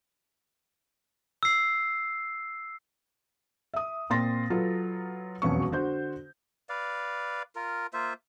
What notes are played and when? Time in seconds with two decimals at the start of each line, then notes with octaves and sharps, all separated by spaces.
1.43 E6 C7
3.74 E5 D#6
4.10 A#2 A#3 C4 C6 A6 A#6
4.50 F#3 F4 A4 B4
5.42 E1 B1 F2 C#4 B4 C#6
5.72 D3 F#4 C5 G6
6.69 B4 D5 F5
7.55 F4 A#4
7.93 A#3 F4 C5 E5